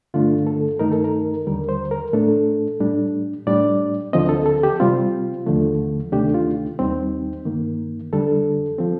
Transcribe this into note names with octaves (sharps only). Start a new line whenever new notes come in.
G2 D3 A3 D4 F4
A4
G2 D#3 A3 D#4 A#4
A4
A#4
D#2 D3 G3 A#4
C5
A#4
A2 A3 D4 A4
A2 G3 D4
A2 G3 D4 D5
D2 D3 F3 C4 D#5
A4
A4
G4
C3 G3 C4 F4
D#2 D3 F3 A3
D2 C3 D#3 A3 D4 G4
F4
D#2 D#3 G3 C4 D#4
G2 D#3 A#3
F2 D3 G3 D4 A4
F3 C4